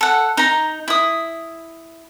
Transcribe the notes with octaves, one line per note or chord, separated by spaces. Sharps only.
A4 F#5
D#4 A#5
E4 D#6